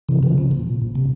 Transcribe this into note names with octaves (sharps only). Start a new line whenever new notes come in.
C3 E3
C#3 F3
C#3
A#2
C3